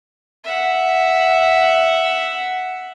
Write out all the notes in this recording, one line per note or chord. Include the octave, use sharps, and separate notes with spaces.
E5 F#5